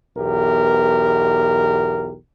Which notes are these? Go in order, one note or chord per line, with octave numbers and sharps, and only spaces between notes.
B1 E2 G4 A#4